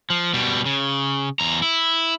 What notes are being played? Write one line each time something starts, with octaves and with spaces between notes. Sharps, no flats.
F3
B2 G3
C#3
E2 A#5
E4